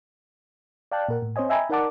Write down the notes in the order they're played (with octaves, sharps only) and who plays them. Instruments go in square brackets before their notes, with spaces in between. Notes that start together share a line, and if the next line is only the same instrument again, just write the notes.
[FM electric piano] D5 F5 G5 A5 F#6
A#2 A#4 F#5
A2
C4 C5 C#5 D#5 G#5
D#5 E5 G5 G#5 A#5 B5
D#4 A#4 D5 F#5 A5 D6